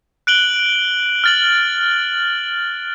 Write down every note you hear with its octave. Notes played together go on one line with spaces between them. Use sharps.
F#6 D7 F#7 G7
F6 A6 F#7